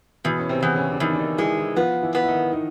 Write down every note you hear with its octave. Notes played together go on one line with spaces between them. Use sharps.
E2 B2 B3
C#4
C3 C4
E2
C#3 C#4
D4
E2 D#3 D#4
D4
D#3 D#4
E3 G#3 E4
E3 E4
F3 B3 F4
E3 E4
B3
E4
D#3 D#4
D#3 D#4